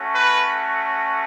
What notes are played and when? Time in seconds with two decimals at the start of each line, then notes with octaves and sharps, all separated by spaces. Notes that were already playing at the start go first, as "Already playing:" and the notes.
Already playing: A3 C#4 F#4
0.14 B4